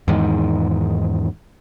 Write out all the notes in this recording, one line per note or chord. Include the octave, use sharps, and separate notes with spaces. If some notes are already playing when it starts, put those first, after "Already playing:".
E2 G#2 D#3